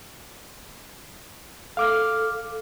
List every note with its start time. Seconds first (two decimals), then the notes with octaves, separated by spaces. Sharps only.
1.77 A4 F5 D6 F6